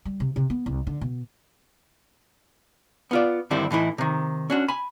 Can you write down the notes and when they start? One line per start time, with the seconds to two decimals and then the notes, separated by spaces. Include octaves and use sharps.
0.05 G3
0.20 C3
0.36 C3
0.50 B3
0.66 C2
0.87 D3
1.01 B2
3.11 B3 F4 D5
3.51 G2 D3 D#3 G3 C4 E4
3.71 A2 E3 D#4 E4
3.98 C3 D#3
4.50 C#4 D4 F#4
4.68 G#5 B5